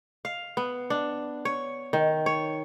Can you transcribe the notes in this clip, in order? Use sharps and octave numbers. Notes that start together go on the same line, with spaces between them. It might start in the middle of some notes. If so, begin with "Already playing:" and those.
F5
B3
D4
C#5
D#3
C#5